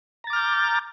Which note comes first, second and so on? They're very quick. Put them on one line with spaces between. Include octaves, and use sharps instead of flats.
A#5 A6 D6 F6 G6